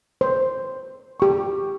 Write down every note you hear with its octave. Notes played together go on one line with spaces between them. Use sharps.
C5
G4 C#6